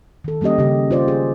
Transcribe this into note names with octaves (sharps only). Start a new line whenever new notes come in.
D#3 A4
G3 A#3 C#4 G4 D#5
C#3 G4
F4 C5 D5
G#4